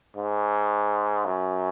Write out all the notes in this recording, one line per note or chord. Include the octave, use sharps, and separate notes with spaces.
G#2
F#2